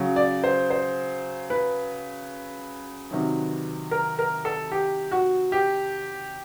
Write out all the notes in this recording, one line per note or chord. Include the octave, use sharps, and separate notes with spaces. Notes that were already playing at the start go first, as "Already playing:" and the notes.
Already playing: C#3 F#3
D5
C5
C5
B4
C3 D#3 F#3
A#4
A#4
A4
G4
F#4
G4